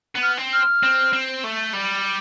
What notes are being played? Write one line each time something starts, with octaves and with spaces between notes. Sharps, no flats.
B3
F6
C4
F6
C4
C4
A3
G3